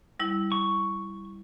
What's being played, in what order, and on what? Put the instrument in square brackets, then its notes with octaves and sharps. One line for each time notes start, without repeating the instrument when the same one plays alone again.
[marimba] G3 E4
[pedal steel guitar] C#6